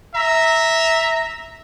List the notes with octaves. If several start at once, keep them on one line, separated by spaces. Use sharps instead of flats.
E5 A#5